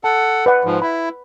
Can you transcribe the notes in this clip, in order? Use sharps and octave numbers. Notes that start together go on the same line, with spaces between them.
A4 F#5 A5
B4 D5 F#5
G#2 F3
E4 B5